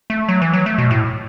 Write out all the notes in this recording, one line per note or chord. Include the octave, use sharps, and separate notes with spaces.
A3
F#3
E3
F#3
A3
B2
A2